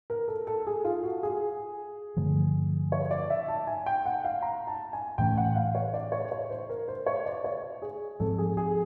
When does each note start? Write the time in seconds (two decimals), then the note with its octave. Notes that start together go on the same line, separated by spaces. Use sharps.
0.10 A#4
0.28 A4
0.47 A4
0.67 G#4
0.85 F4
1.04 F#4
1.23 G#4
2.17 G2 D3 F3 A3
2.92 C#5
3.11 D5
3.30 E5
3.48 A5
3.67 G#5
3.86 G5
4.06 F#5
4.25 F5
4.42 A#5
4.67 A5
4.93 G#5
5.18 A2 E3 A3 C#4 G5
5.37 F#5
5.56 F5
5.75 C#5
5.94 D5
6.12 C#5
6.32 C#5
6.51 C5
6.69 A#4
6.88 C5
7.06 C#5
7.26 D5
7.44 C#5
7.82 G#4
8.20 G#2 F3 G#3 C4 A4
8.38 G#4
8.57 G#4